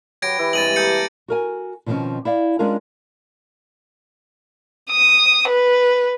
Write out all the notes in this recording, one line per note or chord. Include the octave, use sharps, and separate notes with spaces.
F#3 G4 B4 C#5 G#6 A#6 D7
E3 E4 G4
G2 C3 G#3 A6 D#7 F#7
A#3 G#4 A4 G6 C#7
F#4 A#4 G#5
B2 D#3 F3 A3 C4 C#4
E4 D5 F5
G#3 C#4 D4 F4 G#4 A#4
D#6
B4